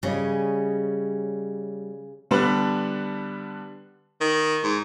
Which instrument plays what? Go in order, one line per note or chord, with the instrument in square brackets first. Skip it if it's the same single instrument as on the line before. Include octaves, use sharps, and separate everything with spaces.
[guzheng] C#3 [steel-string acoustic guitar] G3 C#5 D#5
[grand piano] D3 G3 B3 D4 B4
[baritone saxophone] D#3
G#2